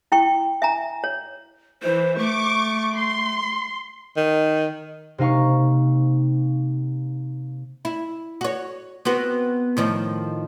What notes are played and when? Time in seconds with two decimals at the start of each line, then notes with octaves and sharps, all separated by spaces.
0.12 E4 G5 C#6
0.62 E5 G#5 A#5
1.04 C#5
1.83 E3 C5
2.18 A3 C#6 D6
2.95 C6
4.17 D#3
5.18 C3 A#3 D#4 F5 C#6
7.85 E4
8.41 F#4 C#5
9.05 B3 C4 F#4
9.77 A2 D#3 F3